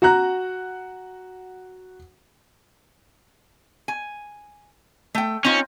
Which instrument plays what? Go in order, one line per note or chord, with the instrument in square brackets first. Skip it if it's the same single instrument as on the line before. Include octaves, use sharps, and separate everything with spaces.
[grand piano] F#4 F#5 A#5 F#6
[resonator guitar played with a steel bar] G#5
A3 G5
[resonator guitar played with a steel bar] C4 D#4 F4 [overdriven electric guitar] C#4